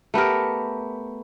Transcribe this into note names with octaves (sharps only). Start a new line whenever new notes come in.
A3 B3 G4 A#4